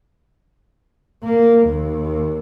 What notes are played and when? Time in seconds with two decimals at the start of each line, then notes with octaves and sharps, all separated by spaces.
1.24 A#3
1.66 D#2